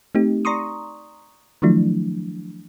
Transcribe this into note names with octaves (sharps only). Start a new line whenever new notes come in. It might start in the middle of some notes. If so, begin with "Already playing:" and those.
A3 C4 D#4 G4
D5 A#5 C6 C#6 D#6
D#3 F3 F#3 A3 D4 E4